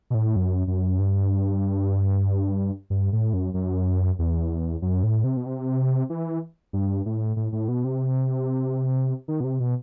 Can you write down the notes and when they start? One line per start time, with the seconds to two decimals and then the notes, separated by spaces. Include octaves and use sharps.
0.10 B2
0.14 A2
0.36 F#2
0.67 F#2
0.99 G2
2.90 G2
3.13 A2
3.33 F#2
3.54 F#2
4.19 E2
4.82 F#2
5.03 A2
5.24 C3
5.37 B2
5.46 C3
6.10 E3
6.73 G2
7.06 A2
7.36 A2
7.52 A2
7.68 B2
7.84 C3
9.28 D#3
9.40 B2
9.44 C3
9.60 B2